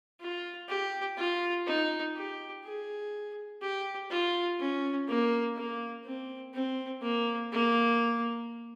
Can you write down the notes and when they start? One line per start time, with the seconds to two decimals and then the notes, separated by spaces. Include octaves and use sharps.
0.20 F4
0.68 G4
1.17 F4
1.66 D#4
2.16 G4
2.64 G#4
3.61 G4
4.10 F4
4.59 C#4
5.08 A#3
5.56 A#3
6.04 C4
6.54 C4
7.02 A#3
7.52 A#3